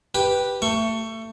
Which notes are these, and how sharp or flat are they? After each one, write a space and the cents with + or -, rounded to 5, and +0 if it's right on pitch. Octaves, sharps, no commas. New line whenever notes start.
G4 +0 B4 -5
A3 +25 C#6 +0